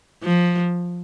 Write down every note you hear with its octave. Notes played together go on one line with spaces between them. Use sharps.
F3